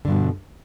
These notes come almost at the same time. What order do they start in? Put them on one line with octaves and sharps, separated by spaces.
D3 G2 B2